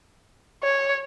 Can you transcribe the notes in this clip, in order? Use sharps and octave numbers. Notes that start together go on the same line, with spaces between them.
C#5